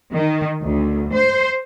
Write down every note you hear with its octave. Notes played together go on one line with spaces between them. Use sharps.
D#3
D2
C5